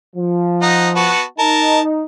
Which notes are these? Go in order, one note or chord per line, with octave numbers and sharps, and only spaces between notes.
F3
D#4 D#5 F#5
B3 F#4 A5
D#4 A#4 A5